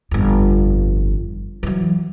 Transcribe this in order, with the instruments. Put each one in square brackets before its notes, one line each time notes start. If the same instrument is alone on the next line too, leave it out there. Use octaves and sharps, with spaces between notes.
[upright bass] G1 F2
E3 F#3